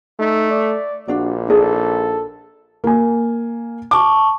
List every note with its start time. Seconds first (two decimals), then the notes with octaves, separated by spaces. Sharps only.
0.19 A3 D#4
0.50 D5
1.08 A#1 D4 F#4 D5
1.50 D#4 G#4 A4 D5
2.84 A#3 G#5
3.91 A5 C#6 D6